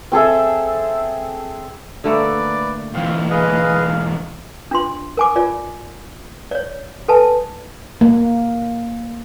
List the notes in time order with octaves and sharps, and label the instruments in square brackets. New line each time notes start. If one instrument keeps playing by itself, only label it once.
[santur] C4 G#4 A4 E5
[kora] D3 A3 A#3 [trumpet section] B4 D5
[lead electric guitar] B1 E3 [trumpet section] C4 F4 F5
[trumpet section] G#3 F5 [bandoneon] G#4 B4 D#5
[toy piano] D4 F4 C6
A#4 G#5 D6
F4 D5 G#5
C#5 D5
A4 B4 G#5 A5
[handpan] A#3